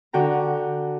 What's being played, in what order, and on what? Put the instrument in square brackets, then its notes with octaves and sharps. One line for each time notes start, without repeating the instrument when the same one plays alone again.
[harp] D3 F#4 G5 A#5